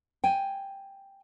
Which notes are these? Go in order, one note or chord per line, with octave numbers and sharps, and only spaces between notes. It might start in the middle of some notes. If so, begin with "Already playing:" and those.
G5 G#5